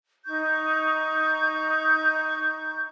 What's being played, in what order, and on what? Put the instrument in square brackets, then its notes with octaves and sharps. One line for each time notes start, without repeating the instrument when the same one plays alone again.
[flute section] D#4 C#6 G6